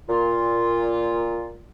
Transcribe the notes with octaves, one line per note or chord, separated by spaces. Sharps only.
A#2 F4